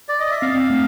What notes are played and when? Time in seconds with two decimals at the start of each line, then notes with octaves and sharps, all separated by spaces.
0.09 D5
0.20 D#5
0.31 E5
0.41 C4 F5
0.70 A3